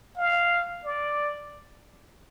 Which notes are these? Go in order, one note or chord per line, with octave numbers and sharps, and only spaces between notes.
F5
D5